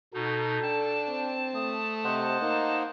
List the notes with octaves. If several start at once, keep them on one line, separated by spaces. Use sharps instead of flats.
B2 D#4 F#4 A4
D4 G5 A5
C4
A3 D#6
C3 C5 D#5 F#5
A#3 D#4